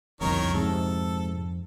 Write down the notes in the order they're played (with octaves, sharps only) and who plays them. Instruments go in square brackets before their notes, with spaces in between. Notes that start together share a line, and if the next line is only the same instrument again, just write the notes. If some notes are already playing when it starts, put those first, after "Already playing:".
[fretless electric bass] G1 C2 [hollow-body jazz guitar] F2 [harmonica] D#3 A#4 C#5
[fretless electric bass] G#2 C3 [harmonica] A4